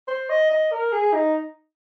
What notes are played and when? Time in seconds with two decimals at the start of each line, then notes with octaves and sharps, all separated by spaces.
0.08 C5
0.29 D#5
0.51 D#5
0.72 A#4
0.92 G#4
1.13 D#4